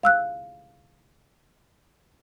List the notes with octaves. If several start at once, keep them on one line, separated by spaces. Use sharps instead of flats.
F5 E6 F#6